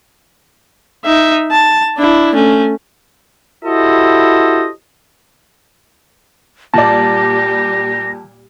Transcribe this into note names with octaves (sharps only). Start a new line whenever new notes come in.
D#4 E5
A5
D4 E4
A3 C#4
E4 F#4 G4 A4 C5 D#5
A#2 G3 G4 D5 A5 A#6